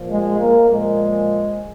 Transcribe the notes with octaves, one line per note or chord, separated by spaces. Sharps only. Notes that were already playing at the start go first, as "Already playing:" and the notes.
Already playing: A#2 F3
G#3
A#3
A#2 F3 G#3